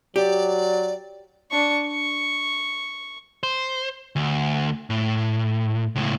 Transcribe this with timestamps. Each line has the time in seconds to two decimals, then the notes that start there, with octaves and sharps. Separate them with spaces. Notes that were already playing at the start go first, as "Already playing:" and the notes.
0.16 F#3 G4 D5
1.51 D4 C#6
1.86 C#6
3.43 C5
4.16 D2
4.90 A2
5.95 C#2 A2